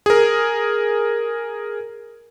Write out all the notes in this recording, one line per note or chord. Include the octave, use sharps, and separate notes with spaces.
G#4 A#4